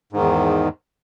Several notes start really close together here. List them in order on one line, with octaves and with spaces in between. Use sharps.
G#2 D#3 E2